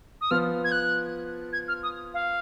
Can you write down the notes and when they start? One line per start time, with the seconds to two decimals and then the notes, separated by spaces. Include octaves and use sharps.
0.21 D#6
0.31 F3 B3 F4 F6
0.64 G#6
0.72 F#6
1.53 G#6
1.68 F6
1.83 D#6
2.14 F5